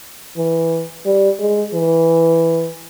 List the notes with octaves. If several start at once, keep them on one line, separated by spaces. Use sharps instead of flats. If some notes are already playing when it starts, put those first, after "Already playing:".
E3
G3
G#3
E3